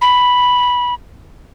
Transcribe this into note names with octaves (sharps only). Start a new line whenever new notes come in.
B5